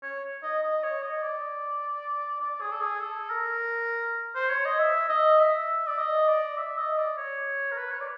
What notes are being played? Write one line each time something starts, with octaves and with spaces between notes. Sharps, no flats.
C#5
D#5
D#5
C#5
D#5
D5
D5
G#4
A4
G#4
A4
A#4
C5
C#5
D#5
E5
D#5
E5
D5
D#5
D5
E5
D#5
D5
C#5
A#4
B4
C#5
D5